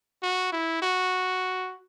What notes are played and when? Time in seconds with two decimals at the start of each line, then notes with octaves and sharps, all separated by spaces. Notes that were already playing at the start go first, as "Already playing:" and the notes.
0.22 F#4
0.52 E4
0.82 F#4